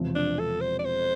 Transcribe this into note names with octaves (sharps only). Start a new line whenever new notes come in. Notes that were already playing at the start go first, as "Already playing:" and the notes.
Already playing: E1 E2 C3 F3 C4
D4
A4
C5
D5
C5